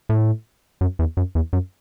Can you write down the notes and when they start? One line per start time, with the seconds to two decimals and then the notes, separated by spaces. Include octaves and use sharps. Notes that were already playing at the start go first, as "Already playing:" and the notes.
0.09 A2
0.81 F#2
0.99 E2
1.17 F#2
1.35 E2
1.53 F#2